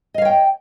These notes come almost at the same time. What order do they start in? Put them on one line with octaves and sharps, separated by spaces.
D#5 F5 C#5 G5